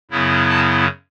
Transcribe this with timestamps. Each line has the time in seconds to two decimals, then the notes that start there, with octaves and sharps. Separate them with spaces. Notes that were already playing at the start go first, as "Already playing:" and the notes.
0.11 F#2 C#3 F#3 B3 E4
0.50 A5